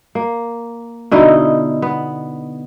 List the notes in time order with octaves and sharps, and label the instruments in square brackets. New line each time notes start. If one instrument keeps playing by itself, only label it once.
[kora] A#3
B2 D3 D#4 E4
B3